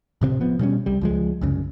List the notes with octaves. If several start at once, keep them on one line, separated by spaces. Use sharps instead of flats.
D1 C3 B3 C4
F3 B3
B2 G3 C4 C#4
C2 G3
C#2 F3 G#3
C2 F#2 C#3